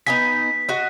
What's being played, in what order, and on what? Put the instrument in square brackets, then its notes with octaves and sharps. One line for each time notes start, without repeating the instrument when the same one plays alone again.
[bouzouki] B3 D#4 G#5 [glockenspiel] B6
[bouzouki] F#4 D#5